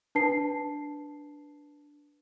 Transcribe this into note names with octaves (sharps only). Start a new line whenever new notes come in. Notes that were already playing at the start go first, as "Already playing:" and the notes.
D4 B4 A5 C7